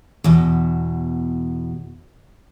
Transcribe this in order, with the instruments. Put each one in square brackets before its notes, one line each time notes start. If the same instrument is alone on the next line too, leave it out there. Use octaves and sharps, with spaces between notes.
[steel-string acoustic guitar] E2 B2